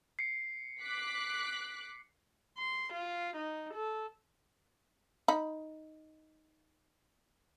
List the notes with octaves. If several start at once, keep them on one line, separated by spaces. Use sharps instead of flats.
C7 C#7
D6 F#6 B6
C6
F4
D#4
A4
D#4 B5